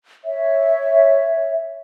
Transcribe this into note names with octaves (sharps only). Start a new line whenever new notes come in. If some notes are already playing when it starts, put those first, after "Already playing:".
C#5 E5